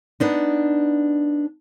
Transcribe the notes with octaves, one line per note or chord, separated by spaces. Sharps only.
B3 D4 D#4